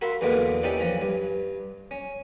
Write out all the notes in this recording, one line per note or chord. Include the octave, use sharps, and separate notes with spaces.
F#4 A#4 E5 F5 B5 C6
E2 B2 D3 A#3 B3
C#4 D#4 E4 G4 B4 D5
E3 F3 C#4
G2
C#4